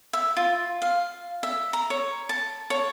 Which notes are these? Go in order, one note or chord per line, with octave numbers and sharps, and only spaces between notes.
E5
F4
F5
E5
A#5
C#5
A5
C#5